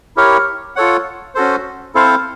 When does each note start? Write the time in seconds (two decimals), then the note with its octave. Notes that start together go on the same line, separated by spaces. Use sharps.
0.17 E4 G4 A#4 C#5
0.76 F4 A4 C#5 F#5
1.35 C#4 F#4 A4 C5
1.95 C4 E4 A4 C5 F5